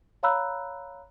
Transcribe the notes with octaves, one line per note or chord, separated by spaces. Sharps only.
C#5 F5 A#5 B5 E6 F#6